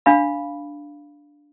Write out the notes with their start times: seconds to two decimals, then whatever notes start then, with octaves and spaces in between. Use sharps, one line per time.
0.06 D4 F5 B5